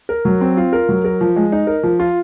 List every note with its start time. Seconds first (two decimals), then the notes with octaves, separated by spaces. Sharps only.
0.09 A#4
0.25 F#3
0.41 C4
0.57 F4
0.73 A#4
0.89 F#3
1.05 A#4
1.21 F3
1.36 G#3
1.52 D#4
1.67 A#4
1.83 F3
2.00 F4